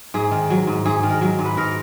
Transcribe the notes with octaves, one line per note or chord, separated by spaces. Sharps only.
G#2 G#4
D#3
F#3
G#2
G#2 G#4
D#3
A#4
F#3
G#2
B4
G#2 A#4